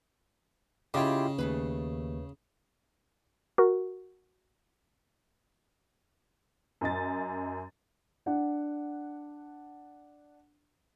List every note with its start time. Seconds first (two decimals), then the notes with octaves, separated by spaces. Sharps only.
0.94 C#3 E4 F4 G4 D#5 G5
1.38 D#2 A3 G#4 B4
3.58 F#4 A#4
6.81 F#2 D#5 A6
8.26 D4 F#5